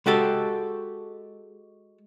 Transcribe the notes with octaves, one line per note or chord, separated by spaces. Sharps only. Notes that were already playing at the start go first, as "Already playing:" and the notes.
G#3 F#4 G4 A4